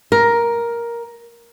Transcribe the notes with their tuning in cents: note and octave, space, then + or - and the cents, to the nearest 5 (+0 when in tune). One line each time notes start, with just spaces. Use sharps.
A#4 +10